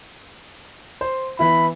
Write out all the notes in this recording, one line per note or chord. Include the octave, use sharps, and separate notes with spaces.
C5
E3 B3 E4 B5